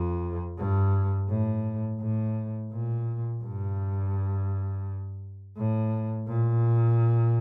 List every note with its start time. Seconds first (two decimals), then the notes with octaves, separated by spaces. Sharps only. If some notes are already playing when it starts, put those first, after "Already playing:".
Already playing: F2
0.58 G2
1.29 A2
2.00 A2
2.72 A#2
3.43 G2
5.57 A2
6.28 A#2